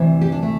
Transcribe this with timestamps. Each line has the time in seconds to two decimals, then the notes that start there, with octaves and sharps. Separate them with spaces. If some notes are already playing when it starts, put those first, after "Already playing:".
Already playing: D2 C3 E3
0.21 G4
0.32 D4
0.43 A3